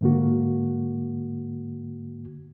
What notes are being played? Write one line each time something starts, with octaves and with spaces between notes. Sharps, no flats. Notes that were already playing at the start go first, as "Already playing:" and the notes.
G#2 D3 A#3 F#4